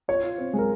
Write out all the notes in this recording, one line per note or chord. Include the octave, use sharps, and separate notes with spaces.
F4 C#5
F4
C4
G#3 A#4